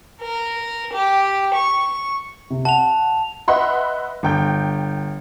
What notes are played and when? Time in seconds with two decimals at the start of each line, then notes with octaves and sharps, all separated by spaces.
0.21 A#4
0.93 G4
1.55 C#6
2.50 C3
2.65 F#5 A5 F7
3.48 B4 D#5 E5 F#5 B5 C6
4.23 G1 G5 G6